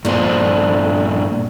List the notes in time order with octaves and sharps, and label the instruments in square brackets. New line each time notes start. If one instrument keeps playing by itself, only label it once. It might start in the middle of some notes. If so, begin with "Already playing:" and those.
[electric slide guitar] G2 A#2 C5 [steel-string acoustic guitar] D4 A4